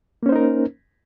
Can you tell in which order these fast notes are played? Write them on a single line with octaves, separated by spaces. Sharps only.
A#3 C#4 C5 D#4 A#4